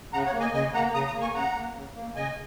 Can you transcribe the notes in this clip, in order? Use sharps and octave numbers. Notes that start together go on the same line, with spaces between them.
C#3 F#5 A#5
C#5 F#5
A#3
D#5 G#5
C#3 D#5 G#5
A#3 F#5 A#5
C#3 A#5 D#6
A#5 D#6
A#3
G#5 C#6
C#3 F#5 A#5
A#3
C#3
A#3
C#3 D#5 G#5